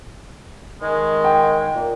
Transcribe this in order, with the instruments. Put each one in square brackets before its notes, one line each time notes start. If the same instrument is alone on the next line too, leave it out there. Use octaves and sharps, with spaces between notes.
[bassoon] D#3 [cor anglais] G#3
[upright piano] G5
[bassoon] A#2